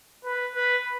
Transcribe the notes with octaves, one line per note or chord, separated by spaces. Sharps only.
B4
B4